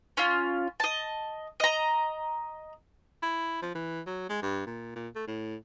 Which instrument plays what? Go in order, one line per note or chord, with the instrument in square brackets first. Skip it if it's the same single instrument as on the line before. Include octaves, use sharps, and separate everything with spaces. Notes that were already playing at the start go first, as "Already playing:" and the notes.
[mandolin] C#4 F4
D#5 A5
D#5 A#5
[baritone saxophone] E4
F3
E3
F#3
G#3
G2
A#2
A#2
A3
A2